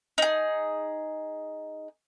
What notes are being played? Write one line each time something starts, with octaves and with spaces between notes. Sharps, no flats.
D#4 G#4